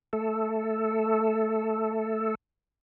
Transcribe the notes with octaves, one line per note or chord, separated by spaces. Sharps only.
A3 A4